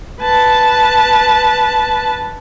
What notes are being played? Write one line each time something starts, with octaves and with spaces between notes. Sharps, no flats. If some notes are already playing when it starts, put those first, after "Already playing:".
B4 A5